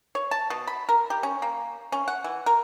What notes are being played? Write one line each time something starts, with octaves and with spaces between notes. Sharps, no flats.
C#5
A5
B2
B5
A#4
G4
C#4
A#3
C#4
F#5
E3
A#4